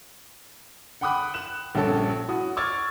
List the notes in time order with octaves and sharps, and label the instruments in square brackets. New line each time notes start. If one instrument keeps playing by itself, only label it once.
[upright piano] F#5 G5 B5 D6 D#6 F#6
F#6 E7
A#1 G2 C#4 A4 A5
E4 F#4 D#6
C#6 D6 E6 F6 G#6 A6